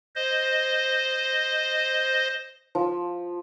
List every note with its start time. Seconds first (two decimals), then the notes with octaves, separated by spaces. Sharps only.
0.16 C5 D#5
2.75 F3